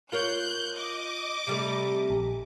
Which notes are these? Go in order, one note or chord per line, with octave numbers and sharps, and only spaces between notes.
F4 A#4 C#5 F#6 G6
D#5 D6
C3 G3 A3
A#1